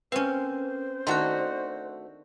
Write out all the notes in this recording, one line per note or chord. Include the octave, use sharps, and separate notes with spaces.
A#3 C4 C#4 B4 C5
D#3 A3 D4 F#4 C6 F#6